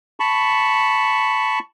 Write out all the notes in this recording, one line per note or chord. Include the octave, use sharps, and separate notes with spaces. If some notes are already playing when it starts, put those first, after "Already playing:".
A5 B5 C#6